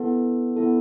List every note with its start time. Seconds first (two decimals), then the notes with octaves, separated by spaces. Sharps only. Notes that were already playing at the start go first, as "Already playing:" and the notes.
Already playing: B3 E4 A4
0.57 B3 E4 A4